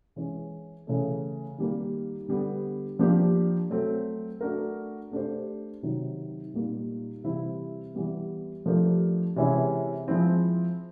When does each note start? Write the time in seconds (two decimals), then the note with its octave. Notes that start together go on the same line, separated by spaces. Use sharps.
0.16 E3 G#3 C#4
0.87 C#3 E3 A3
1.58 D#3 G3 A#3
2.28 D3 G3 B3
2.99 F3 A#3 D4 G4
3.70 F#3 A3 C4
4.41 A3 D4 F#4 A#4
5.12 A3 D4 G4 C5
5.83 C3 D#3 F#3
6.53 A#2 G3 A#3 D#4
7.24 C3 E3 G3 C4 E4
7.95 E3 G3 B3
8.66 F3 A3 D4 G4 A#4
9.36 C3 E3 G#3 C#4 E4
10.07 F3 G#3 C4 E4